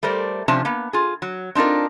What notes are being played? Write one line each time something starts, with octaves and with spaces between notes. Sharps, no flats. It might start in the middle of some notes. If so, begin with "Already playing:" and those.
G3 A3 A#4 C5 D5
C3 F3 C#4 D4 C5 A5
A#3 B3
F4 G#4
F#3
C4 D4 D#4 F4 A#4